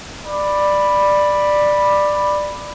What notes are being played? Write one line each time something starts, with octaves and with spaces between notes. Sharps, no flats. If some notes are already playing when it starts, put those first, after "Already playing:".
D5 B5